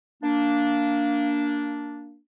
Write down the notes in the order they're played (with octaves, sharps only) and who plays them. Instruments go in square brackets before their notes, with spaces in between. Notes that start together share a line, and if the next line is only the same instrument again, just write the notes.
[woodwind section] A#3 D4